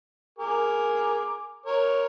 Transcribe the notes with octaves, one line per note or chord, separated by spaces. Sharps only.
G#4 A#4 D6
A#4 C#5